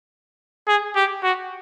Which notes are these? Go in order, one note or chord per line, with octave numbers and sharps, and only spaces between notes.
G#4
G4
F#4